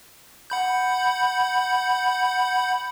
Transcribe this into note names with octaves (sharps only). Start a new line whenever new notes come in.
F#5 B5 G6